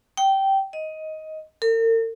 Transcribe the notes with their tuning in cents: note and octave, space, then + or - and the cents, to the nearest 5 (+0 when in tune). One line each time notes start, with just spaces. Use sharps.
G5 -15
D#5 +10
A#4 -45